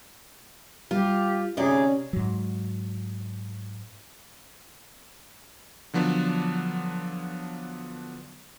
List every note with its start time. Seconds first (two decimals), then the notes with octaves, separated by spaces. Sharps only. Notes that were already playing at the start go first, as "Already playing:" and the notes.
0.91 G3 F4 G4
1.57 D2 C3 C#4 D#4 G4 G#4 D5
2.13 G#2 F#3
5.94 D3 F3 F#3 B3 D4